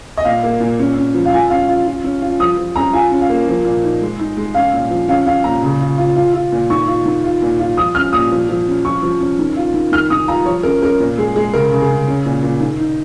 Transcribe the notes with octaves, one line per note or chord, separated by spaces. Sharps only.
D#5
A#2 F5
A#3
A#2
C#4
C#4
F3
F5
F4 G#5
C#4 F5
F4
F4
C#4
F4
F3 D#6
F3
C#4 A#5
F4 G#5
C#4
F5
A#3
F3
A#2
D#4
G#3
D#4
G#3
C#4 F5
A#2
F3
C#4 F5
C#4 F5
A#2 A#5
C#3
F4
F4
F4
F4
A#2
D#3 C#6
F4
D#3
F4
A#2
F4
F3 D#6
C#4 F6
A#2 D#6
F3
F3
C#4
F3 C#6
F3
C#4
D#3
F4
D#3
D#3 F6
D#3 D#6
F4 A#5
F3 C#5
C#4 A#4
C#4 A#4
A#2
G#3 G#4
G#3 G#4
C#3 A#4
C#3
G#4
C#3
C#4
A#2
A#2
D#3
D#4